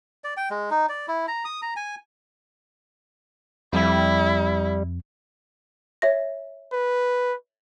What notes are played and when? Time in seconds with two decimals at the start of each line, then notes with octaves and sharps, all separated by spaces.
0.24 D5
0.37 G5
0.50 G#3
0.71 D#4
0.89 D5
1.08 E4
1.28 A#5
1.45 D#6
1.62 A#5
1.76 G#5
3.73 F2 G3 E4
6.02 C#5 E5 A#6
6.72 B4